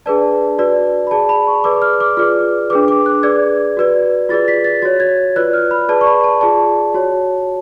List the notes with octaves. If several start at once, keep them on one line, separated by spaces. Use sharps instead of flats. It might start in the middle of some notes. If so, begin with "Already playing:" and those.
D4 G#4 B4 D5 A5
F#4 B4 D5
B5
G#4 D5 A5
B5
C#6
G#4 B4 D5 D6
F6
D6
F4 G#4 B4 D5 F6
D4 G#4 B4 D6
D6
F#6
G#4 B4 D5 G#6
F#4 B4 D5
F4 G#4 B4 D5 A6
B6
A6
F#4 C#5 A6
G#6
F4 B4 D5 F#6
F6
B5
G#4 B4 D5 A5
C#6
B5
A5
F4 G#4 D5 A5
F#4 C#5